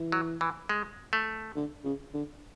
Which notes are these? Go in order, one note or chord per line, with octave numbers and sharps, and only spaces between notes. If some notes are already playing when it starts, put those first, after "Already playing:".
Already playing: E3
F#3
E3
G#3
A3
D3
C#3
D3